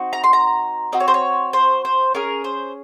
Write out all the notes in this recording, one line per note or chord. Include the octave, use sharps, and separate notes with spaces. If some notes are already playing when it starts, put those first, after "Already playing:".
Already playing: C4 D#4 F#4
A#5
C6
A#5
C4 F#4 D#5
C#5
C5
C#5
C5
C5
C#4 G#4 A#4
C5